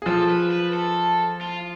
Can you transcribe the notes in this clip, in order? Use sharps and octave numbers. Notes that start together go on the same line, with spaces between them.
G#4
F3 F4 A4
B4
B4
A4
F4